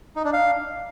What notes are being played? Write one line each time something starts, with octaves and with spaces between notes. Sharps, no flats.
D#4
D4
F5